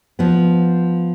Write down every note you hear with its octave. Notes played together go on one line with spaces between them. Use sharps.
F3 B3